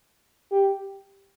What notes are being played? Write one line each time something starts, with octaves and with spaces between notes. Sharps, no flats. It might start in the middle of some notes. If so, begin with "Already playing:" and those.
G4